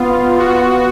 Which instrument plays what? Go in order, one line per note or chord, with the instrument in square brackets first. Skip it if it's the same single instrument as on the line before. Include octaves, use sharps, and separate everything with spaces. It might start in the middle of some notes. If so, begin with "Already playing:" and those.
Already playing: [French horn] B3 [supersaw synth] F4
[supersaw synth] F#4